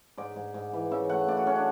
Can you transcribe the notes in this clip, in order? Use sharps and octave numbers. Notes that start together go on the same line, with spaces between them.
G#2 D5
G#2
G#2
E3
C#3 E5
A3 F#5
C#3 D5
F#4
F#3 C#4
D4